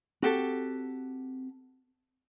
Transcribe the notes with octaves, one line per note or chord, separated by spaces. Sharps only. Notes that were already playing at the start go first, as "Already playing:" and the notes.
C4 F#4 G4 A4